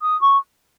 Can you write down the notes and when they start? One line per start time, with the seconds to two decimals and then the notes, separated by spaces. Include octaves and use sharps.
0.01 D#6
0.21 C#6